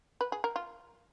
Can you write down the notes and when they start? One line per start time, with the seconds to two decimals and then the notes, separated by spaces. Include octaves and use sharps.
0.21 B4
0.32 G#4
0.44 A#4
0.56 F4